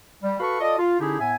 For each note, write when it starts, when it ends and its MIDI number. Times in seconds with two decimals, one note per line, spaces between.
0.22 0.35 55
0.40 0.59 66
0.40 0.59 69
0.40 0.59 71
0.40 0.59 77
0.40 0.59 83
0.40 0.59 85
0.60 0.76 65
0.60 0.76 69
0.60 0.76 74
0.60 0.76 75
0.78 0.99 65
0.99 1.17 50
0.99 1.17 61
0.99 1.17 63
0.99 1.17 64
0.99 1.17 67
0.99 1.17 68
1.20 1.35 45
1.20 1.35 59
1.20 1.35 76
1.20 1.35 80